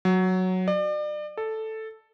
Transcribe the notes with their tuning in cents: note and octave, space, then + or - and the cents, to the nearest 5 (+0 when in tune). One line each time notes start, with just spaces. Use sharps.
F#3 +0
D5 +35
A4 +0